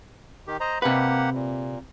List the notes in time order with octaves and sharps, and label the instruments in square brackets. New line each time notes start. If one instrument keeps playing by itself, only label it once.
[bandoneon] D#3 G4
C5 D#5 A#5
[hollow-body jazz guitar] C3 B4 [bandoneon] A#3 G4 F#5
[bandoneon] A#2